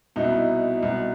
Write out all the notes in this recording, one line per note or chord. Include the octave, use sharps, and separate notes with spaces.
C2 B2 D#4
E4
D#4
C2 B2